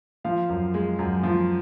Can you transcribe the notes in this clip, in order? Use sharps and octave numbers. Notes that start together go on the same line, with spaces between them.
F3 F5
F#2
G#3
F#2
F3